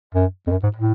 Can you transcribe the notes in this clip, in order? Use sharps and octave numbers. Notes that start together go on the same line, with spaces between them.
F#2
F2
F#2
G#2
A2